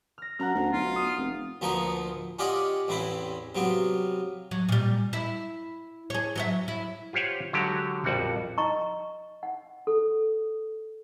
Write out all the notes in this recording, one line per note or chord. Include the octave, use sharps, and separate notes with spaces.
F6 A#6
F#2 F#5 A#5 F6
D2
B1 F4
D#6
F1
D2 A#2 F3 B3 D#4 C#6
C#4 F4 G4 D5 D#5 F#5
A1 E2 C4 E4 B4
C3 F#3 B3 F4
F#3
A#2 G3
E4 E5
G#4 C#5
F#3 C#5 E5
E4
F4 G4 C5 C#5 F#5
D3 F#3 G#3 F#4 G4
A#1 F2 G3 F#4 F#5
D#5 A#5 C#6
F#5
A4